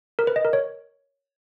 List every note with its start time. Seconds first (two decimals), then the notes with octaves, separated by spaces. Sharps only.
0.19 A#4
0.27 B4
0.36 D#5
0.45 A#4
0.53 C#5